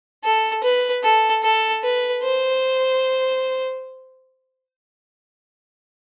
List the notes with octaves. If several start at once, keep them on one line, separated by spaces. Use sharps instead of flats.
A4
B4
A4
A4
B4
C5